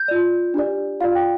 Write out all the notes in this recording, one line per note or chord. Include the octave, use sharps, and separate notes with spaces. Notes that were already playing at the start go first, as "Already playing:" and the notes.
Already playing: G6
F4 D5
D4 G4 D5
F4 D5 F5
G5